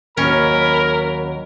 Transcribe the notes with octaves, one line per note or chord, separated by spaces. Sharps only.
D#2 F#3 C#4 A#4 B5